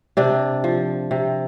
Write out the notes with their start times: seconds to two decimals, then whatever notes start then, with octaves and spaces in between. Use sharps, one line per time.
0.17 C3 D4
0.64 F3
1.11 C3